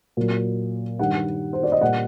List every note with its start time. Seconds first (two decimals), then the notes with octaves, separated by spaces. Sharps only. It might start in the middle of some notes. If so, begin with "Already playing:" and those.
0.17 A#2 F#3
0.99 G2 D#3 G3 F#5
1.53 C5
1.63 D5
1.72 D#5
1.81 A#2 G3 F#5